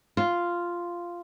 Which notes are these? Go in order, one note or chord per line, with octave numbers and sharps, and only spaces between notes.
F4